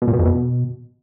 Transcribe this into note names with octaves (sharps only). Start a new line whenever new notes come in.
B2
A#2
B2
F2
B2